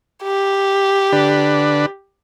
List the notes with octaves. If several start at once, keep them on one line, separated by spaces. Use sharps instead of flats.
G4
D3 D4 B4